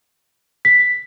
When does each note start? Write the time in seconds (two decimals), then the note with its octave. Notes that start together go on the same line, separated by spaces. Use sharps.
0.65 B6